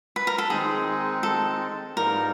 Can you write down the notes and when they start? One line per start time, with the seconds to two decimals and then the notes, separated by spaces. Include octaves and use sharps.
0.16 B4
0.27 A#4
0.38 A4
0.50 D#3 G#3 C4 D#4 G#4
1.23 A4
1.96 G#2 E3 G3 A#3 D#4 A#4